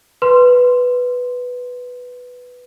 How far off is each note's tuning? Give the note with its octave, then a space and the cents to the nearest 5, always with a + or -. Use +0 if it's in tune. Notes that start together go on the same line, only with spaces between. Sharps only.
B4 +0 C6 +0